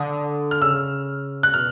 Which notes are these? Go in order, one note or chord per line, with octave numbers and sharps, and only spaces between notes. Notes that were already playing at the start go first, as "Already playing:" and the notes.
Already playing: D3 D#6
F6
C#3 E6
F#6
B2 F6